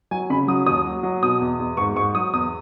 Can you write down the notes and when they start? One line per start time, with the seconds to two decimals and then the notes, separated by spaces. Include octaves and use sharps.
0.11 F#3 G#5
0.30 C#3 B5
0.48 F#3 D#6
0.66 D#2 D#6
0.85 F#3
1.03 F#3
1.22 B2 D#6
1.40 E2
1.59 E2
1.77 G#2 C#6
1.96 G#2 C#6
2.15 F#3 D#6
2.33 E2 D#6